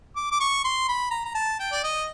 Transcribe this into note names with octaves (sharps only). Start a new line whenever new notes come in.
D6
D6
C#6
C6
B5
A#5
A#5
A5
G5
D5
D#5